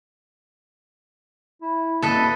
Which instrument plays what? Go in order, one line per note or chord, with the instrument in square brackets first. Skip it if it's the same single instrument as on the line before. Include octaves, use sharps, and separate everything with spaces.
[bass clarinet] E4
[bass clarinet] A#3 [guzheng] A4 B4 D#5